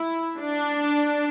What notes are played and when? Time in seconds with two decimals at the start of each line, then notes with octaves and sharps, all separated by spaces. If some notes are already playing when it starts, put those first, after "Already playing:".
Already playing: E4
0.38 D4